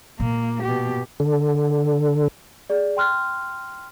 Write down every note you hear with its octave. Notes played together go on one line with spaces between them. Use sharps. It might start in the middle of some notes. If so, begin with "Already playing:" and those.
A#2 A#3
B2 G4
D3
G#4 D5
G5 C6 F6 F#6